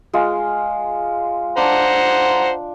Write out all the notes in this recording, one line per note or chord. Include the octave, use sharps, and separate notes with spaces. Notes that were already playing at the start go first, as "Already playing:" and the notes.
G#3 F4
D4 C5 F#5 A#5